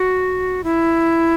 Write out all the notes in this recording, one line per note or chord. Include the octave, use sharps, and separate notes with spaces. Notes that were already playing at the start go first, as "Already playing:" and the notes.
Already playing: F#4
E4